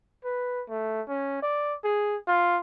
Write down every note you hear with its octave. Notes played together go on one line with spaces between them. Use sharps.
B4
A3
C#4
D5
G#4
F4